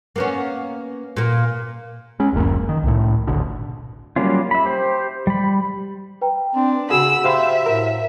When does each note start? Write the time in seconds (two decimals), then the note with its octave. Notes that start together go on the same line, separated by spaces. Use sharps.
0.16 A#3 B3 C#4
1.17 A#2 A#3
2.20 G#3 C#4
2.33 D1 G1 F#2 A#3
2.69 D#3
2.83 C2 A2
3.27 G#1 D2 B2 D3
4.16 F#3 G3 A#3 C#4 F4
4.51 E5 B5
4.65 G4 C5
5.27 G3 B5
6.21 B4 G5 A#5
6.55 C4 D4
6.91 C#3 F#4 G#4 F#5 B5 E6 E7
7.24 G4 C5 E5 F5 B5
7.66 A2 A#4